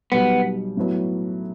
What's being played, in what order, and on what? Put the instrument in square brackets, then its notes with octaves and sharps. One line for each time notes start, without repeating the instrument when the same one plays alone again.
[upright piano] B1 B2 G3 [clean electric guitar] B3
[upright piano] A2 F#3 B3